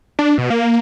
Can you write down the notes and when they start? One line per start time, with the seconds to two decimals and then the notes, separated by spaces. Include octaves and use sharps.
0.19 D4
0.38 B2
0.50 A#3